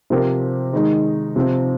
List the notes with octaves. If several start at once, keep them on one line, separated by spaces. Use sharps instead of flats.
C3 F3 C4 G4 A#4
D#3 G#3 D#4
C3 F3 C4